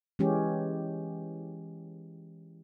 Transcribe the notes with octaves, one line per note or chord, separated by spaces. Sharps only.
E3 G#3 C#4 G4